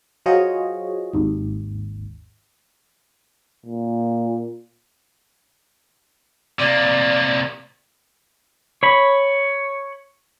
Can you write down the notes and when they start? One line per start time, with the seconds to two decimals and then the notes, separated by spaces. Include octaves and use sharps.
0.26 F#3 F4 G#4 C5 C#5 D#5
1.13 G#1 D#2
3.66 A#2
6.59 C3 A#3 D5
8.83 C#5 B5